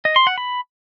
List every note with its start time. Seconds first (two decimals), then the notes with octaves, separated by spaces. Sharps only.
0.05 D#5
0.16 C6
0.27 F#5
0.38 B5